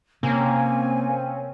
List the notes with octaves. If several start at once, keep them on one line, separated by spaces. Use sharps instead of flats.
C3 A#3 C4 C#4 G#5